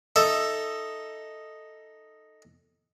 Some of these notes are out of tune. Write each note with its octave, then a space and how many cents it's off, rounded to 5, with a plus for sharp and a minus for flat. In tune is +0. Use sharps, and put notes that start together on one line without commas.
D#4 +0 A4 +5 E5 +10